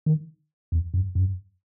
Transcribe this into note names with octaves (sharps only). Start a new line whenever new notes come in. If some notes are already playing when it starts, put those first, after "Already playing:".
D#3
E2
F#2
F#2